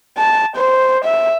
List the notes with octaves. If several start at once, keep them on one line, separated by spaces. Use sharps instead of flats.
A5
C5
E5